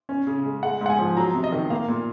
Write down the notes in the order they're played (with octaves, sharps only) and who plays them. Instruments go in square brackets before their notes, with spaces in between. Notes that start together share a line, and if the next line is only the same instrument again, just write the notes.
[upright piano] C#4
C#3
G#3
G#3 F#5
G#2 F#5
G#5
F3
F#3 A#5
C3
D#5
D#3
A#3 F5
A#2